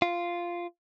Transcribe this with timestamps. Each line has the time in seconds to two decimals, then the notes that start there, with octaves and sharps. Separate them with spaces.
0.02 F4